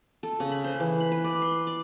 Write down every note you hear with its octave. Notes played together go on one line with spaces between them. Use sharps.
A4
C#3
B5
C5
E3
B5
B4
D5
C6
D5